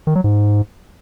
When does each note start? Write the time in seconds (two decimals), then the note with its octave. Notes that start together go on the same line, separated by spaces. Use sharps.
0.07 D#3
0.15 F#3
0.24 G#2